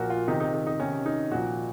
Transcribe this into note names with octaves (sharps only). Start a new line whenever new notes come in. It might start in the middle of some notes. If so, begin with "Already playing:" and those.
Already playing: A#2 F3 F#4 A#4
F4
C3 D#3 D#4
D#4
D#4
D#4
C3 D#3 C#4
D#4
A#2 F3 F#4